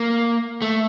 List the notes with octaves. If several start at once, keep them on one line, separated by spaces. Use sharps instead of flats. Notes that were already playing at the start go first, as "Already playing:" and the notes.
Already playing: A#3
A3